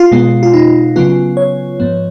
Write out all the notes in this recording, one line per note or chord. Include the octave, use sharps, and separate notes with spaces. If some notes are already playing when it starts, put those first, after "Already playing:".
Already playing: F4
B2 G#3 B3
F4
D#4
C#3 F#3 B3 F4
C#5
G#2 F3 B3